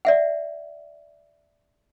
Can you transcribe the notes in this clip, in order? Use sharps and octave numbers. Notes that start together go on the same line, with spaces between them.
D5 E5 F#5